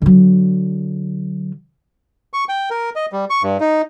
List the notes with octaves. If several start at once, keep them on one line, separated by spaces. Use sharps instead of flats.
D3 F#3
C#6
G5
A#4
D#5
G3
C#6
G2
D#4